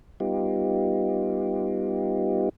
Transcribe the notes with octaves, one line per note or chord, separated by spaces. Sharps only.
G3 B3 D#4 F4 G4